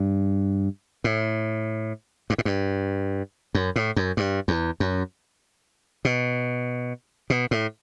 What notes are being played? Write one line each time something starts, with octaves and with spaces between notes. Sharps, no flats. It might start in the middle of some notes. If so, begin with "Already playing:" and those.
Already playing: G2
A2
G2
A2
G2
F#2
A2
F#2
G2
E2
F#2
B2
B2
A2